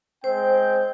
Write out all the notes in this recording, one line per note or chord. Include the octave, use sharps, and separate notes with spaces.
G#3 C4 C5 G5